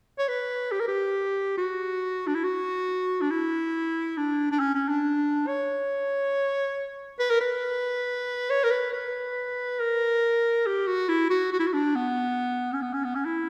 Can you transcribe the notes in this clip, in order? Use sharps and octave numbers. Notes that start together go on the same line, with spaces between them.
C#5
B4
G4
A#4
G4
F#4
D4
E4
F#4
D4
E4
D4
D4
C#4
C#4
D4
C#5
B4
A#4
B4
C#5
A#4
B4
B4
A#4
G4
F#4
E4
F#4
F#4
E4
F#4
D4
B3
C#4
B3
C#4
B3
C#4
E4